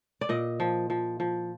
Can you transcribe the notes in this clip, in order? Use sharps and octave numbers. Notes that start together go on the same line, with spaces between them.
D5
A#2 D#5
F3
F3
F3